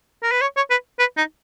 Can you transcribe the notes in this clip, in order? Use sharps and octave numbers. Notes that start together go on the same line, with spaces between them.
A#4
B4
C#5
C#5
B4
B4
D#4